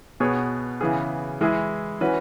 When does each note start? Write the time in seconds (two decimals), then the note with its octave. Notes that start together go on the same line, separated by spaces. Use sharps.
0.20 B2 B3 G#4 C#5
0.81 C#3 E3 B3 G#4
1.41 E3 G#3 E4 G#4
2.01 E3 C#4 F#4 B4